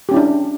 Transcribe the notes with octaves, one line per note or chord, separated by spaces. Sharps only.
C#4 D4 E4 G4